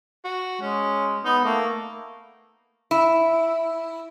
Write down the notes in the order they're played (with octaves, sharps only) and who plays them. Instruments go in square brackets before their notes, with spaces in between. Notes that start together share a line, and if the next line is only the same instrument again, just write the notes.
[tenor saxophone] F#4
[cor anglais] G#3 [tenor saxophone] C#4
[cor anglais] B3 [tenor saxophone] D#4
[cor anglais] A3 [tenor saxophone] A#3
[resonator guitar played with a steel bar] E4